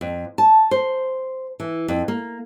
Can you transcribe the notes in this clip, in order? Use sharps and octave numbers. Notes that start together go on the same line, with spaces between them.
F2
A5
C5
E3
F2
A#3